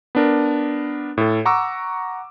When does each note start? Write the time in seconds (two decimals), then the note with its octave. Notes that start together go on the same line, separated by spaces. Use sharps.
0.15 B3 D4 A#4
1.18 A2 A4
1.45 F#5 A#5 C#6 D6 E6